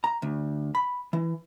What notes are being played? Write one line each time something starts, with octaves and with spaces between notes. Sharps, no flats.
A#5
D2
B5
E3